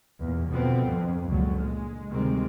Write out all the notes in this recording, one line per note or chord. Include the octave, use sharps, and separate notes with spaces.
E2 A#2
B2 D3 F3 B3 C4
F2
F#1 C#2 A#2 D3 F#3
G#3
D2 C3 D#3 G3 G#3 C4